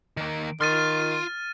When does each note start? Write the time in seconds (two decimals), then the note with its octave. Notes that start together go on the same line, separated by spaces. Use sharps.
0.17 D#3 A#3
0.61 D#3 F4 C6 F6 A6 D#7